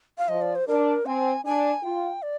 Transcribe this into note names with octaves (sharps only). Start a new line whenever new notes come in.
F5
F3 D#5
D5
C5
D4 A#4
C4 G#5
D4 G#5
F4 G5
D5